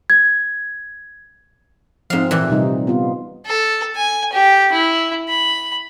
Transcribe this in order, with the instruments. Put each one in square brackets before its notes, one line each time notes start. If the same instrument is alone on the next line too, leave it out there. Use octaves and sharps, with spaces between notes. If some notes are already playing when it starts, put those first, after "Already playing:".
[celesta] G#6
[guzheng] G#2 F5 [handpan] F3 C4
[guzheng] A#2 E3
[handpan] C3 G3 D#4
B3 F4
[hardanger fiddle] A4
G#5
G4
E4
B5